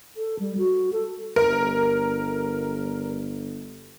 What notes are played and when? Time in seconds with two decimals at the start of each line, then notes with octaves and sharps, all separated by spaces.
0.17 A4
0.39 G3
0.58 F#4
0.93 A4
1.36 G1 A#4